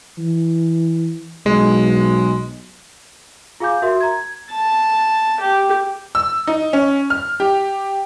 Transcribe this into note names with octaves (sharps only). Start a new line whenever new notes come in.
E3
B1 G#3
F4 G#4 F5 G#5 D6 G6
F#4 A#4 E5 C6
A#5 G#6
G#6
A5
G4
E6
D#4
C#4
F6
G4